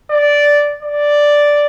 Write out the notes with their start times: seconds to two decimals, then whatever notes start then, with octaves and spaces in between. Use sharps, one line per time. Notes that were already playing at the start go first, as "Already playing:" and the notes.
0.11 D5
0.83 D5